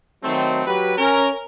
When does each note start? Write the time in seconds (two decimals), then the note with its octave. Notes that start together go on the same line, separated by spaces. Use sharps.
0.23 D#3 F#3 A3 C4
0.67 F#3 G4 B4
0.98 C#4 A#4